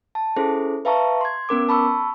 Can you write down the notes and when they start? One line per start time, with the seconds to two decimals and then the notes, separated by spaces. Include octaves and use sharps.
0.15 A5
0.36 C#4 E4 G#4 A4 C5
0.85 B4 E5 F5 A5 A#5 C#6
1.21 C6 G#6
1.49 B3 C#4 A#4 D6
1.69 A5 B5 C#6 E6